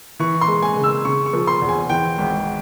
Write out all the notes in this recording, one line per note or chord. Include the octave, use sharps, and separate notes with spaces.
E3 C#6
C6
G#3
G#5
C#3
E6
C#3 C#6
C#6
F3
C6
E2
G#5
E3 G5
G#1